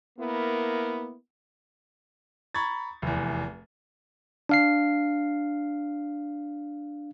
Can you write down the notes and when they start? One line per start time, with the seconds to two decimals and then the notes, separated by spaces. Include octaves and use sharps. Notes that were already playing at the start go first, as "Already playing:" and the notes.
0.18 A#3 B3 E4 A#4
2.55 A#5 B5 C#6 G#6 A6
3.02 F1 E2
4.49 D4 F5 C7